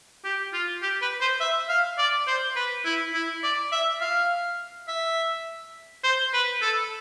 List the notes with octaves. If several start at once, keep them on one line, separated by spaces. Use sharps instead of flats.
G4
F4
G4
B4
C5
E5
F5
D5
C5
B4
E4
E4
D5
E5
F5
E5
C5
B4
A4